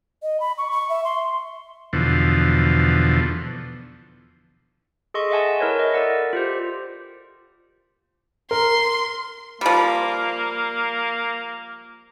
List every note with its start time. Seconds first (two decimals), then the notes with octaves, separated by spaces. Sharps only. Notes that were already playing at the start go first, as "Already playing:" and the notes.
0.23 D#5
0.40 B5
0.58 C#6
0.71 C#6
0.89 E5
1.05 C6
1.93 E2 B2 D3 F3
5.14 G#4 A4 D#5 C6 C#6
5.30 D#5 E5 F#5 G#5 A5
5.60 E4 A#4 B4 C#5
5.79 D#5 E5
5.94 A4 A#4 D5 F#5
6.33 F4 G4 C5
8.51 A#4 C6
9.61 F3 G3 A#3